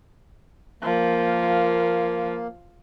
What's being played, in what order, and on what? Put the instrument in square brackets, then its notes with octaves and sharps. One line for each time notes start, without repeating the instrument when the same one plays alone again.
[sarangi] F3 [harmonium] A#3